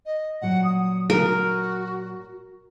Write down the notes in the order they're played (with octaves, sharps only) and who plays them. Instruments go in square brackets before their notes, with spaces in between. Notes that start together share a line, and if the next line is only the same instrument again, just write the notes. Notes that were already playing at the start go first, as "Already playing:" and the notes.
[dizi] D#5
[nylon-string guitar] A#2 F#3 [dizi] F#5
[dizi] D#6
[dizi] F#4 [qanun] A#4